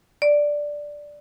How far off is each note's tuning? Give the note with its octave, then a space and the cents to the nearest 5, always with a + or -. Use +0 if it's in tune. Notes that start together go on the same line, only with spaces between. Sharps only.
D5 +0